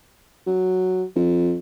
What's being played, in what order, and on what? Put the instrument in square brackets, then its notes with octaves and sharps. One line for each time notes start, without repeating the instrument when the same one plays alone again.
[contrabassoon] F#3
F2